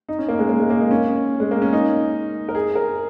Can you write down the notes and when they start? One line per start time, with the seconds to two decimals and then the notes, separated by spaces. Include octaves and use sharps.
0.09 D#4
0.18 C#4
0.28 A#3
0.39 G#3
0.49 A#3
0.60 G#3
0.70 A#3
0.80 D#4
0.91 C#4
1.40 G#3
1.51 A#3
1.62 C#4
1.73 D#4
2.49 A#4
2.55 G#4
2.75 A#4